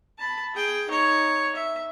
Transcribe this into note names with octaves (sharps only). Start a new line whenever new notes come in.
A5 B5
G#4 G5
D#4 C#5
E5